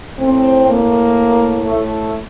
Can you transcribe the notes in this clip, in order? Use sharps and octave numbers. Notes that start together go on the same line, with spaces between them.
A2 C4
A#3
A3